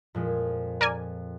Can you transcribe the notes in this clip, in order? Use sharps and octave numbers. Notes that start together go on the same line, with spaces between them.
F2 A#2 G#3
A#4 D5 G#5